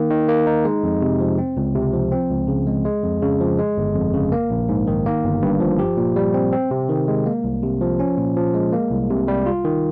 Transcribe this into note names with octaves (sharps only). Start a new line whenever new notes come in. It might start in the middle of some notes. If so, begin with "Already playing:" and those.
Already playing: D#3 A#3
D#3
A#3
D#4
G#3
F2
C3
F3
C4
C#2
C3
F3
C4
C#2
C#3
G#3
G#3
F2
C#3
F3
G#3
G1
F2
C#3
A#3
A#1
G#2
D#3
A#3
G1
G2
F3
G4
A#2
G3
C4
C4
C3
D#3
G#3
A#3
C2
C3
F3
C#4
A#2
F3
G#3
A#3
C2
C3
G3
F4
D#3